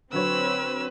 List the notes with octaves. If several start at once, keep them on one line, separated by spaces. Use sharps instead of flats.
D3 F#3 C4 B4 C#5 E6